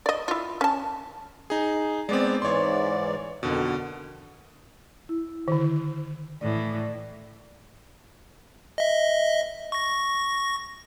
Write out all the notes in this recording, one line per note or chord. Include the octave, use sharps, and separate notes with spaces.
D5 D#5
E4 F4
C#4 A5
D#4 G#4
G#3 B3 C4 D5
G#2 E3 C#5 D5 C6
F2 B2 D3 D#3
E4
D3 D#3
A2 E3 D5
D#5 E5
C#6 A#6